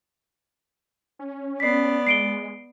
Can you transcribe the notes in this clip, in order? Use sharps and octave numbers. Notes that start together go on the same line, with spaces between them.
C#4
B3 D5 B6 C7
G#3 C7 D7 G7